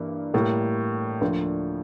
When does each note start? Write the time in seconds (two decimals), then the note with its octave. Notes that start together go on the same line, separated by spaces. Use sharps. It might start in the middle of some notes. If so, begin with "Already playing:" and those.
Already playing: G2 E3 A#3
0.34 A2 G3 A#3
1.21 D2 D3 F3 A#3